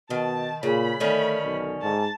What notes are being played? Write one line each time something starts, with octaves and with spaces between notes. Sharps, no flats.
B2 D#3 A5
A#2 C#3 B5
D3 D#3 A3 C#4
B1
G#2 A5